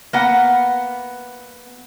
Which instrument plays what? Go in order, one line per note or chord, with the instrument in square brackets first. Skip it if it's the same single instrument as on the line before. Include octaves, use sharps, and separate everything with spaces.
[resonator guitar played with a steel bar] A#3 B3 F#5